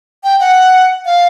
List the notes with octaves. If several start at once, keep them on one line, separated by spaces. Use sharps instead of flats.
G5
F#5
F5